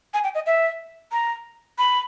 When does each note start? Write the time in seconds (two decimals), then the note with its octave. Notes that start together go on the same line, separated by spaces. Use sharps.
0.14 G#5
0.24 G5
0.35 D#5
0.46 E5
1.12 A#5
1.78 B5